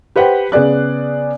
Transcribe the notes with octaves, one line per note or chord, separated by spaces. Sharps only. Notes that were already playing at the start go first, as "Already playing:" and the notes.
G4 B4 C5 F#5 G5
C#3 B3 G#4 D5 F#6